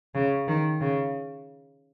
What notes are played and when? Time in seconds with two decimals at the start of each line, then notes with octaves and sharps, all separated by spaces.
0.15 C#3
0.48 D#3
0.81 C#3